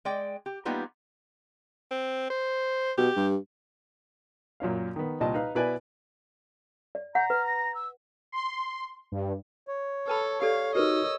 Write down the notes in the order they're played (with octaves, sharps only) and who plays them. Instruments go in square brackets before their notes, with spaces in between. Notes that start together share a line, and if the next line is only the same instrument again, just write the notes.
[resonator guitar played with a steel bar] G#3 D5 G5
G4
G3 A#3 B3 D#4 F4 G4
[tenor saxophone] C4
C5
[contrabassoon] B2 [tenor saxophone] G4
[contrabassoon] G2
[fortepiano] F#2 A#2 C#4 F5
D#3 B3
C2 A#2 D#5 A5
D#4 B4 F5
B2 E4 B4 D5 G#5
[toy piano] D5
[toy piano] F#5 [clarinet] A#5 [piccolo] G6
[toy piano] B4 [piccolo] F6
[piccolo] A#6
E6
[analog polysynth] C6
G2
[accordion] C#5
[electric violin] A4 [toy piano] B4 A5 B5
[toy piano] G4 A4 D5 [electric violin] F5
[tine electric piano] D#4 F#4 [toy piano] G4 A#4 B4 [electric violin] D#5 E6